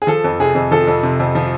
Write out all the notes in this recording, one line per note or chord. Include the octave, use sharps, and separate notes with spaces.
G#4
F3 A4
F2
C3 G#4
F2
F3 A4
F2
C3
F2
F3